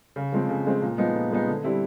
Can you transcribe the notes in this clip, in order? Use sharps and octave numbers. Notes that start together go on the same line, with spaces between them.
C#3
F3 G#3 C4
C#3
F3 G#3 C4
A#2
F3 G#3 B3 D#4
A#2
F3 G#3 B3 D#4
D3
G3 C4 E4